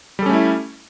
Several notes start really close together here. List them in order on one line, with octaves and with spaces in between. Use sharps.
G3 A4 C#4 A3 E4